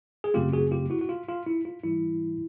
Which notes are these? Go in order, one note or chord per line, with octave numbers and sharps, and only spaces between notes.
G#4
F#2 C#3 F#3 A3 C4 F4 G4
F#4 G#4
F4 G4
E4 F#4
F#4
F4
F4
E4
F4
G#2 E3 G3 E4